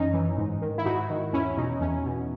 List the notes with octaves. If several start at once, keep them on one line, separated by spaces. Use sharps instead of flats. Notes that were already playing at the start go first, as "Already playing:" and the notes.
Already playing: F#2 E3 C#4 D#4
E3
G#2
D#3
E4
G#2 D#4 F#4
D#3
E2 C#4 E4
B2 D#4
E2 C#4
B2